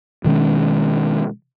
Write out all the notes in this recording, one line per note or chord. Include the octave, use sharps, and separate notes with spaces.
B2 D#3 G#3 C#4